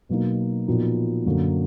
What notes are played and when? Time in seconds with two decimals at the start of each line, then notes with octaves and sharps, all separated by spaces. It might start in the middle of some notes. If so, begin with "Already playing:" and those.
0.09 B2 F#3 A#3 D#4
0.68 A#2 F3 B3 D#4 F#4
1.25 F#2 D3 F#3 A#3